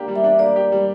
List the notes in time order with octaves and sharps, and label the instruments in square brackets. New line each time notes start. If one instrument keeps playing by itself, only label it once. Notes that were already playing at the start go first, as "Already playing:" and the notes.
Already playing: [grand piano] A#3 D4 G4
G3
[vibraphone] E5
[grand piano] D4
[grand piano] A#3 [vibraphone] D5
[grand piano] G4
G3